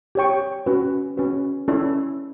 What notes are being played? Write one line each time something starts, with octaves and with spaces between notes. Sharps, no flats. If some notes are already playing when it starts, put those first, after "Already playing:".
G4 C#5 G5 C#6
C#4 F#4 B4
C#4 F#4 B4
C#4 E4 A4 D5